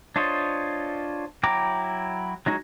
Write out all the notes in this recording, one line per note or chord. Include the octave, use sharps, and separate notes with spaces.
D4 F4 C5 C#5 D#5
F#3 E4 G5 A#5 D6
F#3 G#3 D#4 F#4